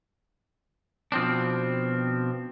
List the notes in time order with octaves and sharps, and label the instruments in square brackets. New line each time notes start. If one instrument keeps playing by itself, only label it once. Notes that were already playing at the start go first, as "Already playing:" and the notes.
[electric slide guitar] B2 F3 C4 D4